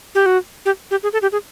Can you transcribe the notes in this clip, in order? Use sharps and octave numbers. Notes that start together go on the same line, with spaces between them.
G4
F#4
G4
G4
G#4
A4
G4
G#4